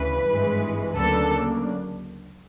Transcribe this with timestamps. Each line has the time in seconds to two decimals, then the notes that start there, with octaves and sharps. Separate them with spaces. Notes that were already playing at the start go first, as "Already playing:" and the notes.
Already playing: D2 C#3 E3 B4
0.28 G#1 G2 E3 G#3
0.97 D2 C#3 F#3 A#3 D4 A4